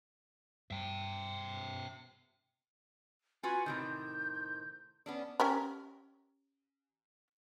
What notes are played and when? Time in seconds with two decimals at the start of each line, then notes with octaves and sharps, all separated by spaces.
0.71 G2 E5 G5
3.43 F4 F#4 B4 G#5
3.66 A2 C3 D#3 G6
5.06 B3 C#4 D4
5.40 C#4 G4 A#4